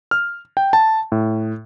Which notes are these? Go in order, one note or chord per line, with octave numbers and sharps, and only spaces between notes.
F6
G5
A5
A2